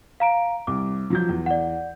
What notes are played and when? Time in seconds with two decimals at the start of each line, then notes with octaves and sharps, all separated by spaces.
0.20 F5 A#5 D7
0.67 C2 D6
1.10 F3 F#3 G6
1.29 E2
1.46 D5 F#5